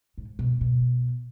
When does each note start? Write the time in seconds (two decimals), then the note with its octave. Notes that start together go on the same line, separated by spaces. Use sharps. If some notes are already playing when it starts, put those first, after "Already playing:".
0.18 G#2
0.39 B2
0.61 B2